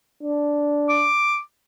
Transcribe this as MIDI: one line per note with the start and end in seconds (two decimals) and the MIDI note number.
0.23 1.10 62
0.89 1.40 86